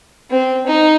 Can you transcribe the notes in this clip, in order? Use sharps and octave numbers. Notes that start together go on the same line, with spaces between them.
C4
D#4